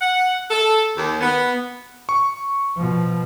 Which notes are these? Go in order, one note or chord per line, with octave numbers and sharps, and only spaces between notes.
F#5
A4
D#2
B3
C#6
B2 F3